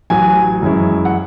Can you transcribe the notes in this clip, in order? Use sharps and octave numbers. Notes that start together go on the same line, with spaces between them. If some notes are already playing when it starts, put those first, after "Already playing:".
A1 A2 F#3 G#5
F#2 E3 G#3 C#4 E4
F#5